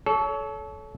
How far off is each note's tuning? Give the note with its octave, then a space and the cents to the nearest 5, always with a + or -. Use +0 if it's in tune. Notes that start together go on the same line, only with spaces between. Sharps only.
A4 -25 C#5 +25